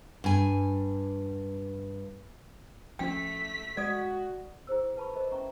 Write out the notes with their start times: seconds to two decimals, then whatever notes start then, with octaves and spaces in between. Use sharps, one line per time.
0.24 G2 G#5
2.99 A#1 F3 A3 C#4 G5 B6
3.77 G#3 F#4 D5 D#6
4.67 E4 G#4 C5 E6
4.96 B4 A5 B5 C#6
5.15 A#4 C5 D#5 D6
5.32 C#4 E5 A#5 C#6